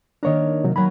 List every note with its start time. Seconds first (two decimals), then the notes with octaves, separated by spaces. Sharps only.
0.23 D#3 A#3 D4 A#4 C#5 D#5
0.64 C3 F#3 D#4
0.76 F#3 A#4 G#5 B5